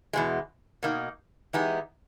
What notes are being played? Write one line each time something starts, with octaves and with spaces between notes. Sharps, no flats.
E2 B2 G#3
B2 A#3 D#4
E3 G#3 B3 D#4 G4